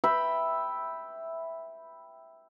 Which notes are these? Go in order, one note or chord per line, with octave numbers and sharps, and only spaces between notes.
E5 G5 B5